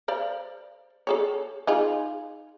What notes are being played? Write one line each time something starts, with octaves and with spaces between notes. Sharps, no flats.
C5 D5 F5
G#4 A4 C#5
D#4 F4 G#4